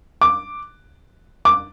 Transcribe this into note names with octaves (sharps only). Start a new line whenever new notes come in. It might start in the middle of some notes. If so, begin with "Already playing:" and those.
D6
D6